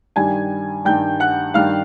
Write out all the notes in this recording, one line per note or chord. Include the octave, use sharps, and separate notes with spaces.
G2 D#3 G3 G#5 G#6
G2 D#3 G3 G5 G6
F#5 F#6
G2 D#3 G3 F5 F6